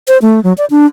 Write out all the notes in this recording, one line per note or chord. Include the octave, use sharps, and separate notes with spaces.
C5
A3
F#3
D5
D4